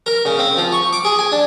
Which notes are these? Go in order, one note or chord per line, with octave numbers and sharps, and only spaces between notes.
A#4
C#3
C4
F3
C#6
D6
G#4
G#5
D4